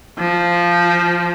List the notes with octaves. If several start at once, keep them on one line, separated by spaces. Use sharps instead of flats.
F3